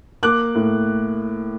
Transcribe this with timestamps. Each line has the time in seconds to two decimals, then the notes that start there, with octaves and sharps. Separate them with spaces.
0.23 A#3 D6 F#6
0.55 A2